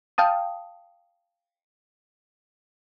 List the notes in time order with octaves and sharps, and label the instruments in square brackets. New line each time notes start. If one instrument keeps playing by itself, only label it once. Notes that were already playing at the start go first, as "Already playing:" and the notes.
[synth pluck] F5 G5 A5 D#6